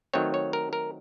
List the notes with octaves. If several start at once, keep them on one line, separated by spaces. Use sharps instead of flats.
D#3 F#3 A3 C4 C#5
C#5
A#4
A#4